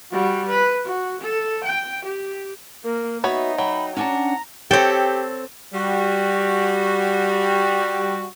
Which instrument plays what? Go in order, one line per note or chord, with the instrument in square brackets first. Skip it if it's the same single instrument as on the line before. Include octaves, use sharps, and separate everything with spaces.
[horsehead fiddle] G3 F#4
B4
F#4
A4
G5
G4
[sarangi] A#3 [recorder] A#4
[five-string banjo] B3 C#5 B5 [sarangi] D#4 [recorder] F#4 [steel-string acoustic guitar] E5
[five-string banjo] F#3 [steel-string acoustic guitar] G5 [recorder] B5
[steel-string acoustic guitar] C#4 D4 A5 [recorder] F#5 [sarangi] A#5
[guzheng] C4 A4 [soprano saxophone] G4 [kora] C#5 G5
[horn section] G3 F#4